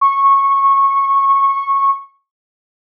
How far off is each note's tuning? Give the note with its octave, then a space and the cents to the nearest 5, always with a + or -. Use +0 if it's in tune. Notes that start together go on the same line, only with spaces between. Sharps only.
C#6 -15